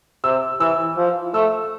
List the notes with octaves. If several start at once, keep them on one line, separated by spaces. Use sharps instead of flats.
C3 E6
E3 E6
F3
A3 E6